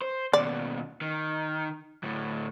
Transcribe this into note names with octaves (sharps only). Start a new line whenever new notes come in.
C5
D#2 B2 D5
D#3
D2 A2